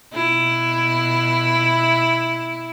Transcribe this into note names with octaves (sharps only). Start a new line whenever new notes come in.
B2 E4